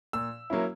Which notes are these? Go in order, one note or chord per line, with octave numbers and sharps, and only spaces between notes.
A#2 E6
F#3 A#3 C#4 E4